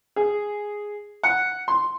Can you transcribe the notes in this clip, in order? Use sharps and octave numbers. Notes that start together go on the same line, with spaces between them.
G#4
F#5
C6